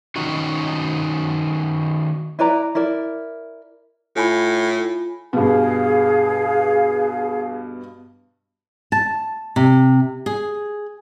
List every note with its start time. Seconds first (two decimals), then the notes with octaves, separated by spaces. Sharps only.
0.16 D#3 C#4 D#4 F#4
2.39 E4 B4 D5 A#5
2.75 E4 A#4 D5
4.16 A2 F4 G#5 B5
5.33 G2 B2 G#4 F5
8.92 A5
9.56 C3
10.26 G#4